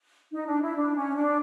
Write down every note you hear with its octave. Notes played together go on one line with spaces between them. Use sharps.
D#4
D4
E4
D4
C#4
D4